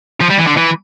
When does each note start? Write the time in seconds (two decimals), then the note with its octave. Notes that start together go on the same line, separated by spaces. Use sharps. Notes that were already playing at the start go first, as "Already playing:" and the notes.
0.20 F3
0.30 G3
0.39 E3
0.47 D3
0.57 E3